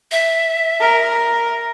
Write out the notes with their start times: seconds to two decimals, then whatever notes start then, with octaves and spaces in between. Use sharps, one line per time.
0.12 E5
0.80 A#4